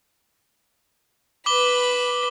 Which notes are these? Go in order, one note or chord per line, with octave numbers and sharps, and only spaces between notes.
B4 B5 D6 G7